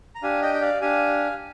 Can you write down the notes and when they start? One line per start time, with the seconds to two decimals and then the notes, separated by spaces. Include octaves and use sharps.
0.15 A#5
0.23 D4 G4 F5 G#5
0.42 D#5 G5
0.54 G5
0.61 D5 F5
0.81 D4 G4 F5 G#5